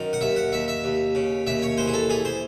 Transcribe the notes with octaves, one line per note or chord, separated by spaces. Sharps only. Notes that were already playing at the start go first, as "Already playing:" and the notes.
Already playing: F#2 D#3
F#5
D#2 E5
F#5
D#2 E5
E5
D#2
C#3
D#2 E5
C#5
E3 C5
G#4
A4
E3 G#4
C5